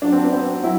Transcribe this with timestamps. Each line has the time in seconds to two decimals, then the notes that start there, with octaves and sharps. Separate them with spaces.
0.02 F#3 D4
0.12 C4
0.23 B3
0.32 F#3 C4
0.63 F#3 E4